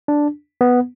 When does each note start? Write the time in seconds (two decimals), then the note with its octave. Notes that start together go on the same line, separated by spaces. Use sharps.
0.08 D4
0.61 B3